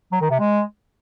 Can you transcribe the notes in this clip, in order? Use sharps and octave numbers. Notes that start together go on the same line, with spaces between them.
F#3
D#3
C3
G#3